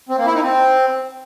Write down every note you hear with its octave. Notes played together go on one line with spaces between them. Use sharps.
C4
A#3
E4
D#4
C4